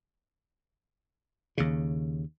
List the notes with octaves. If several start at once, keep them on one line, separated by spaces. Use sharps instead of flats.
D#2 C#3